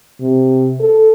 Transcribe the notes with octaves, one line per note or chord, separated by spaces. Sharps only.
C3
A4